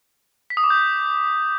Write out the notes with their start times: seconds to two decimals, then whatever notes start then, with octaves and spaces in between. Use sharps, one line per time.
0.50 B6
0.57 D#6
0.64 D6
0.70 G6